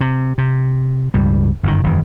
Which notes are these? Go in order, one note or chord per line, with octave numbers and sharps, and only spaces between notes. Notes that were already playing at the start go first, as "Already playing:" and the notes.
C3
C3
C#2 G2 G3
G1 F#2 A2 D#3
E1 F#2 D#3 E3